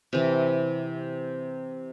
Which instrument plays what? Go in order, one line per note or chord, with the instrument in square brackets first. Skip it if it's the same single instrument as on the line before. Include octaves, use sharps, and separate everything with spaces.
[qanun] C3 E3